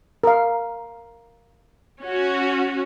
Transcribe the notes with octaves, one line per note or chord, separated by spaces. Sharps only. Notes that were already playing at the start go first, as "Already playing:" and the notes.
A#4 F5
C#4 F#4